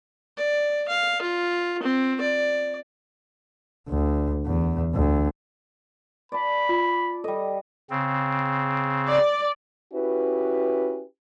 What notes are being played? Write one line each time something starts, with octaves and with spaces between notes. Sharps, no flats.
D5
F5
F4
C4
D5
D2
E2
D2
D5 A5 B5
F4
G3 A4 D#5
C#3 C4
D5
C#4 E4 F#4 G4 B4